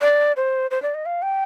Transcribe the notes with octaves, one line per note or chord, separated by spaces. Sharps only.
D5
C5
C5
D5
D#5
F5
G5